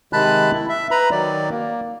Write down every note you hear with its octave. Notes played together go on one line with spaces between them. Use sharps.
C3 D#3 G#3 A5 B5 F#6
E4
E5
B4 A#5 B5
D#3 F#3 D5
A#3